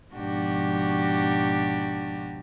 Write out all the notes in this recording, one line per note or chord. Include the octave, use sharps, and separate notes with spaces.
G#2 B2 F3 D4 F#4 G4